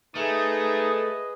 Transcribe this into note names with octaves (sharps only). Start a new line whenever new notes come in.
A3 D#4 G#4 B4
D#5